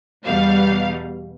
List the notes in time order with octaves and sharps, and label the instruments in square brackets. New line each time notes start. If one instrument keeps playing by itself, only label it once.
[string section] E2 B2 G3 F5